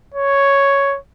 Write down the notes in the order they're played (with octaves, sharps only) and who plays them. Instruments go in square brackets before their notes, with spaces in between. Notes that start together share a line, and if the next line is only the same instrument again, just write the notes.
[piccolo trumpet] C#5